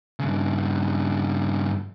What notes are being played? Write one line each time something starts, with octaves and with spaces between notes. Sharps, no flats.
G2 C#3